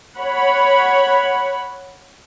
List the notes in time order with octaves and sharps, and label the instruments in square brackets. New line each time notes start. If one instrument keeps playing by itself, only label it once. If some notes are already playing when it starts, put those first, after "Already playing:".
[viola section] C#5 F#5 B5